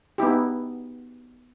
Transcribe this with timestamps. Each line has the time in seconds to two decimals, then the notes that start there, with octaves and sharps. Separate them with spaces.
0.18 B3 D#4 E4 G4